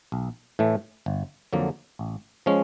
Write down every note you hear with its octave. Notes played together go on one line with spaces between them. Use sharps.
B1
A2 E3 A3
G1
F2 D3 F#3 A#3
A1
F3 G#3 C#4